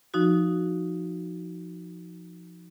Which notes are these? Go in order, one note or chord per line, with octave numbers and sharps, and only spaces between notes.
F3 D#4 F#4